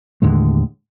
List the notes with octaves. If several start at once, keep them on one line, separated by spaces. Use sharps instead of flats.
D#2 A2 D3 G#3